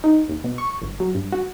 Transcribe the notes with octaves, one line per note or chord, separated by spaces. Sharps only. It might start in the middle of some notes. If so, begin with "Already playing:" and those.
D#4
D#2
B2
C#6
G1
F#3
G2
F#4